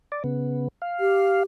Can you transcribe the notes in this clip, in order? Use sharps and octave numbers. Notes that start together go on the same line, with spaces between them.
D5
C#3 B3
F5
G4